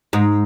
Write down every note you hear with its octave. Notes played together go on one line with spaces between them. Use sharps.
G#2